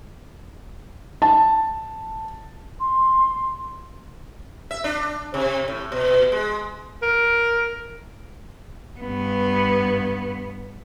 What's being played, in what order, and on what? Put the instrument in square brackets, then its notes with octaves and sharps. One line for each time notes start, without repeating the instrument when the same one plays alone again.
[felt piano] A5
[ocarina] C6
[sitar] E5
D4
C3
A2
B2
B2
G#3
[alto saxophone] A#4
[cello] G2 B3